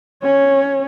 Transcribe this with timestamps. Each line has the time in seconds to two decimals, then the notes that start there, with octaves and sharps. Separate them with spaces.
0.23 C#4 C#5